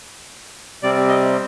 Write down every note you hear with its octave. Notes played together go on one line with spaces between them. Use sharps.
C3 G3 C4 D5
D#5